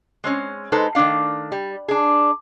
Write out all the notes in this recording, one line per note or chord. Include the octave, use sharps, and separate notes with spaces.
G#3 C4 C#4
G#3 D#4 A4 B4 C5
D#3 A3 C#4 D4 F5
G3
D4 G#4